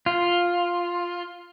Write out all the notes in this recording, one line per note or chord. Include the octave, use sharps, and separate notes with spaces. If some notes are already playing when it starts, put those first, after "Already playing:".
F4